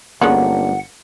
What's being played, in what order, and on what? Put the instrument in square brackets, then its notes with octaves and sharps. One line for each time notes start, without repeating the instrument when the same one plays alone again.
[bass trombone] G1 [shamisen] G#3 B3 F#4 [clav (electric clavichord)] A#3 C#4 D4 [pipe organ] F#5